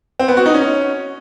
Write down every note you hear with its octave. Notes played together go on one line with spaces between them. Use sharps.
C4
B3
F#4
D#4
C#4